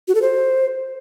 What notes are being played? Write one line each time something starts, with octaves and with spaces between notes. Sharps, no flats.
F#4
A4
C5